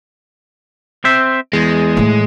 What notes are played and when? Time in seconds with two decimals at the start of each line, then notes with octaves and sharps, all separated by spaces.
1.04 C4 C5 E5
1.53 E2 G#3
1.97 A2 E3